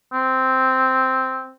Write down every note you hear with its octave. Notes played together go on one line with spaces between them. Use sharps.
C4